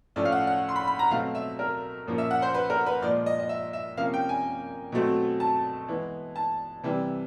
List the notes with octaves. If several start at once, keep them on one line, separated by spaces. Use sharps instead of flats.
A2 F3 A3 C#4 D5
F5
F#5
F#5
C6
B5
B5
A#5
B2 F#3 A3 C4 F5
E5
A#4
A#2 F3 A#3 C#4
E5
F#5
C5
B4
A#4
B4
A#2 F3 G#3 D5
D#5
D#5
E5
E5
C3 F3 A#3 C#4 F5
G5
G#5
B2 F#3 A3 C4
A5
E3 G#3 B3
A5
C3 E3 G3